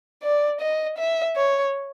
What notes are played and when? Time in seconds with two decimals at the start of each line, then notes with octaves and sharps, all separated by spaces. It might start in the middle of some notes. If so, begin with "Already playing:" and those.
0.23 D5
0.61 D#5
0.98 E5
1.36 C#5